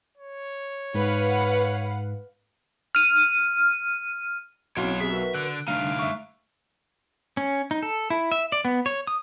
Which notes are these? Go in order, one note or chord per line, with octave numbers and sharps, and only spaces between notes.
C#5
G#2 B4 F5 F#5
F6 D#7
B1 F#3 C4 C#4 E4 C#5 F5 C6
C4 G4 G#4 E5
F#4 A#4 B4
D3 F#6
D3 G3 A3 D4 D#4 F5
E5 C#6
C#4
D#4
A4
E4
E5
D5
B3
C#5
D#6